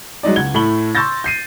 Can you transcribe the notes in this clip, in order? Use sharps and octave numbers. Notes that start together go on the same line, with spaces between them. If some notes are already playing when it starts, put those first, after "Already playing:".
F#3 G#3 D#4 D5
C#2 F#5 G#6 G7
A2 A3 B5 F#7 G7
C6 C#6 E6 G6 A6 A#6
G6 C7 D#7